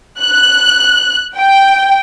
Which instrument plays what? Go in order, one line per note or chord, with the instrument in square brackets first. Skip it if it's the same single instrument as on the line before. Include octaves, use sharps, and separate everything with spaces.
[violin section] F#6
G5